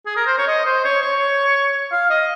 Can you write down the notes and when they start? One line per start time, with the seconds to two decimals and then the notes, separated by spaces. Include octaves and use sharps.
0.06 G#4
0.17 A#4
0.27 C5
0.38 C#5
0.47 D#5
0.65 C5
0.85 C#5
1.02 C#5
1.91 F5
2.10 D#5